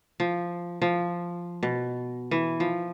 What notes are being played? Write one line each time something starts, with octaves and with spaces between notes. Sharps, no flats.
F3
F3
B2
E3
F3